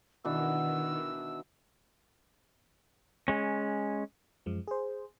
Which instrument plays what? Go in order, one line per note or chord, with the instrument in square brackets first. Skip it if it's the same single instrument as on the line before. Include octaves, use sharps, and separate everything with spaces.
[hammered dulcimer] B2 E3 D4 [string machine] D#3 [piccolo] E6
[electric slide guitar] G#3 C#4
[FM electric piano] F#2 F3 G#3
G#4 C5